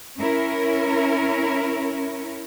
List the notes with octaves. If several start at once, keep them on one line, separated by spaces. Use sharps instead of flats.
C#4 E4 A#4